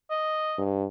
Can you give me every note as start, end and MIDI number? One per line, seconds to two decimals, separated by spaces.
0.10 0.60 75
0.58 0.87 43